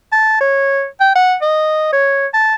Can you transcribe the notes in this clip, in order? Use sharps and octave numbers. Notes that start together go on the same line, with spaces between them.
A5
C#5
G5
F#5
D#5
C#5
A5